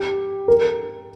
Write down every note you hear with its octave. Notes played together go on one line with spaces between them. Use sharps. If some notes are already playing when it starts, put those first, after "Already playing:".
Already playing: G4
A#4